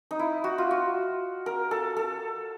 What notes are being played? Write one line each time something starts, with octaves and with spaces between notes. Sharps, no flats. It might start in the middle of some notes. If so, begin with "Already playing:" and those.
D#4
E4
F#4
F4
F#4
A#4
A4
A4